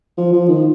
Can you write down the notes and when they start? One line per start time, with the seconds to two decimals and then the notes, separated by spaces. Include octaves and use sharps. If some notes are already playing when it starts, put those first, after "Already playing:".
0.18 F3
0.33 F3
0.48 D#3